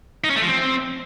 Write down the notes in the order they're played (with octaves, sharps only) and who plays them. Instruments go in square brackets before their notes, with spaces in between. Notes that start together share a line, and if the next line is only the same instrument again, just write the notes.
[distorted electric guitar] D#4
C#4
A3
F3
C4